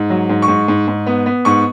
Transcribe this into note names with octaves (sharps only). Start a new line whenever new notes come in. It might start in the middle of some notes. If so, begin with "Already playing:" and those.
Already playing: G#2
F#3
G#2
C#6
G#2
G#2
G#2
B3
B3
G#2 C#6